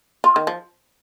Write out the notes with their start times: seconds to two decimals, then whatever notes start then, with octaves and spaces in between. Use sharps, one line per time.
0.24 F4
0.36 D#3
0.47 F3